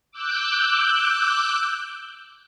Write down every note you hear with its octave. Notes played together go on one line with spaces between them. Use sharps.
D6 E6 F#6 G6